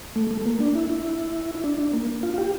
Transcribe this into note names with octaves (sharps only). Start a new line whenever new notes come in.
A3
A3
A3
A#3
D4
E4
E4
E4
D4
D4
A#3
F4
F4
G4